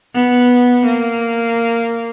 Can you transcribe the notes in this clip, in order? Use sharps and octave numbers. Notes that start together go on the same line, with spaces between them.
B3
A#3